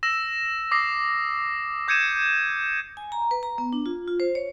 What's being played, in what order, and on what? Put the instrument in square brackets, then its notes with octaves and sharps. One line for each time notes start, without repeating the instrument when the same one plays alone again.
[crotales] E6 A#6 E7
D6 D#6 A#6 C7
D6 G6 G#6 C#7 D#7 E7
[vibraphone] G#5
A#5
B4
A#5
B3
D4
F4
F4
C5
C#5